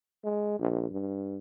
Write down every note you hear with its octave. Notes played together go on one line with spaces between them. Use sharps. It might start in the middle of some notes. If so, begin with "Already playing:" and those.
G#3
A#1
G2